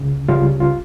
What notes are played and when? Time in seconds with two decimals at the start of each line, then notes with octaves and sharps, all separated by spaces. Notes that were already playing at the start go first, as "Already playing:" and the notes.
Already playing: C#2 C#3
0.29 C#2 C#3 G3 C#4 F4
0.60 F4